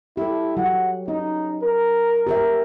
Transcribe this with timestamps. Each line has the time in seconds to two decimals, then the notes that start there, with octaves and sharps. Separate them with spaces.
0.17 E4 G4 A4
0.57 F#3 F#5
1.08 C#4 D#4
1.62 A#4
2.27 G4 A#4 E5